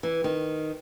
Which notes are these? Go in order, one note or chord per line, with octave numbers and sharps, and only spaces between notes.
E3
D#3